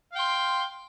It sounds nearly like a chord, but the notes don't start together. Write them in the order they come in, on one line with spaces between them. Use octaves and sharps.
F5 G5 C6